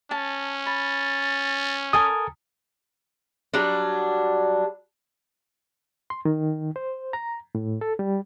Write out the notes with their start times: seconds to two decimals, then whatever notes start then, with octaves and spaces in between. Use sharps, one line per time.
0.11 C#4 A5
0.66 B5 A6
1.93 A4 A#4 G#5 D#6
3.54 F#3 G3 D4
6.10 C6
6.25 D#3
6.76 C5
7.13 A#5
7.55 A2
7.81 A4
7.99 G3